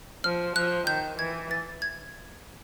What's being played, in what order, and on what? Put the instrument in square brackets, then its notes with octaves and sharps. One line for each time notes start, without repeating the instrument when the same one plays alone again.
[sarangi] F3 [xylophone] F6
[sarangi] F3 [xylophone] F#6
[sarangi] D#3 [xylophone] G6
[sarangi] E3 [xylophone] G#6
[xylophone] A6
G#6